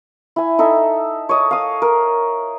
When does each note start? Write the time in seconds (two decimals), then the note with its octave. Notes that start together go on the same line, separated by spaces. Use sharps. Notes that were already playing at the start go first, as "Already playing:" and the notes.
0.36 E4 G#5
0.58 D#4 A4 E5
1.29 C#5 D#5 D6
1.51 F5 D#6
1.82 A#4